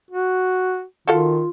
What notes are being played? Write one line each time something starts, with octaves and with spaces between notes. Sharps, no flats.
F#4
D#3 F4 F#4 A4 F5